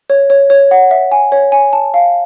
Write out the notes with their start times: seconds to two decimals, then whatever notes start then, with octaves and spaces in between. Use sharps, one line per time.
0.10 C#5
0.30 C#5
0.50 C#5
0.71 F#5
0.91 E5
1.12 G#5
1.32 C#5
1.52 G#5
1.73 A5
1.94 F5